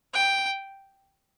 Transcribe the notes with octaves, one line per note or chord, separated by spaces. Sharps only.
G5